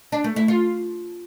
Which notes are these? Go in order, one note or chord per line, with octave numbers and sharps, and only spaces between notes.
D4
A3
E4
F4